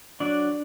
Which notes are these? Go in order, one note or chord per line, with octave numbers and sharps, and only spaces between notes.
F#3 D4 D5